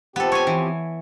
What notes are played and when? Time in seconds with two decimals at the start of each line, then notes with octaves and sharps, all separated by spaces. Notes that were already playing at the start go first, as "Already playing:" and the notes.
0.16 F3 B3 C4 G4 A4
0.32 C#5 G#5
0.47 E3